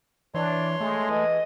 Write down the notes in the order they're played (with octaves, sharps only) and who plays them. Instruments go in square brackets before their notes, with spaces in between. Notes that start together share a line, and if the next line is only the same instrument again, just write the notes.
[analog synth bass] E3 [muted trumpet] D4 [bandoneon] C#5 C6
[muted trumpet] G#3 [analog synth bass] A3
[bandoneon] E3 [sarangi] D#5